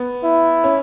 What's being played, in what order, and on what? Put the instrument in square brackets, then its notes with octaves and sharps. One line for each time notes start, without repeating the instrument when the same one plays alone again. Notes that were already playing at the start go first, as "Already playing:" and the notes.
Already playing: [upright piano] B3
[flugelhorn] E4
[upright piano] C#4